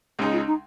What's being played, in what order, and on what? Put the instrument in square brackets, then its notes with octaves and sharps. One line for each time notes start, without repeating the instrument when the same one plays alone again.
[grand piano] C#2 C#3 G#3 D#4 [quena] G#4
[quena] F4
D#4